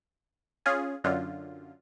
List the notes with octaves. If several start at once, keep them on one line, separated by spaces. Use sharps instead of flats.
C#4 F4 G#4
F#2 D3 F4